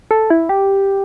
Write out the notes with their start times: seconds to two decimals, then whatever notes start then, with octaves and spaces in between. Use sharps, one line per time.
0.11 A4
0.30 E4
0.49 G4